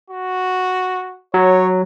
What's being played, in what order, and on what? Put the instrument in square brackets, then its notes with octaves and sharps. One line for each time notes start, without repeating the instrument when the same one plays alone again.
[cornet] F#4
[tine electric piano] F#3 [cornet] C#5